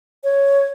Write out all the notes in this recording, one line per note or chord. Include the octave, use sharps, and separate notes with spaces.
C#5